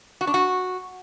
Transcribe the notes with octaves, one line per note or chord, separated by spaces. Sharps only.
F#4
D4
F#4